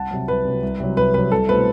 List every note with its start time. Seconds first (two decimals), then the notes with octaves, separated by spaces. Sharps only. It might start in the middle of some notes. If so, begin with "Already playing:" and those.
Already playing: C2 F#5 A5
0.11 C3 F#3
0.28 C2 B4
0.45 C3 F#3
0.63 C2
0.80 C3 F#3
0.97 C2 B4
1.14 C3 F#3 B4
1.31 C2 A4
1.49 B2 A3 C4 E4 B4